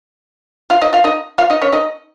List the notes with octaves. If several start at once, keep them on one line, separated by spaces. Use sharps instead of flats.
F4 F5
D#4 D#5
F4 F5
D#4 D#5
F4 F5
D#4 D#5
C#4 C#5
D#4 D#5